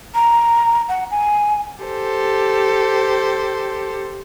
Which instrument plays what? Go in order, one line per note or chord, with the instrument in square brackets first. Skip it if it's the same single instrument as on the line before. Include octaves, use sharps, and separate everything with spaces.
[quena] A#5
F#5
G#5
[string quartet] G4 A4 C5